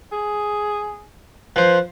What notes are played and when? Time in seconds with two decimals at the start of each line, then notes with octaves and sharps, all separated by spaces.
0.12 G#4
1.56 F3 B4 C5